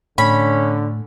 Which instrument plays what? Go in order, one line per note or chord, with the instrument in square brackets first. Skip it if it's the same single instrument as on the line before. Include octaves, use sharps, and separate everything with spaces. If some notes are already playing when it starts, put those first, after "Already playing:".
[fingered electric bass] A2 [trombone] D3 [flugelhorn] C#4 [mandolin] B5